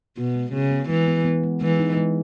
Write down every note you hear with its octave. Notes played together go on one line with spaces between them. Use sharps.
B2 F#4
G#3
C#3 B3
B3
E3 G#3
B3
B3
G#3
E3 G#3
D#4
G#3